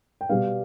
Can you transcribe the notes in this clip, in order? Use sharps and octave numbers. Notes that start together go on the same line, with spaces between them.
G5
B2 G3 B3 F5